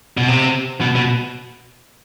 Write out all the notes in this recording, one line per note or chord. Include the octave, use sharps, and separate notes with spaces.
B2
C3
B2
B2